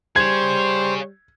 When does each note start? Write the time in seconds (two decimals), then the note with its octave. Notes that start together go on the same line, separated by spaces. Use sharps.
0.16 G3 G#4 C5 C#5 G#6